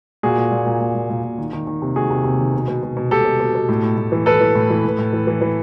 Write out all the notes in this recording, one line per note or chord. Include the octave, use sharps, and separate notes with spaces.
A#2 F#4 G#4
A#2
A#2
A#2
A#2
A#2
A#2
A#2
D#3
D#3
D#3
C3
D#3 F#4 G#4
C3
C3
D#3
B2
B2
B2
B2
B2 G4 A4
B2
B2
B2
A2
A2
A2
E3
E3 A4 B4
E3
A2
E3
A2
A2
E3
E3
E3